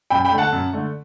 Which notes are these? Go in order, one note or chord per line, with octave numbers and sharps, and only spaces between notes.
F#2 G5 B5
G5 B5
D3 A3
F#5 A5
F#2
D3 A3